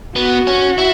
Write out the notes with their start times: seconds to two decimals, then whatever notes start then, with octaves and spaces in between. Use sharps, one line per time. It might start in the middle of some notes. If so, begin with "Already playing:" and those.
0.16 B3 F#4
0.47 C#4
0.78 E4